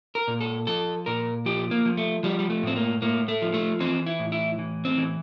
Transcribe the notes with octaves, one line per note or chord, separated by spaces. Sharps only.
A#4
A#2
A4
F3 A4
A#2 A#4
F3 G4
A#3
F3
A3
F3 G3
G3
A3
A2 C4
A#3
A2 A#3
A3
F3
A3
E3 C4
E4
A2
E4
E3
C4
E3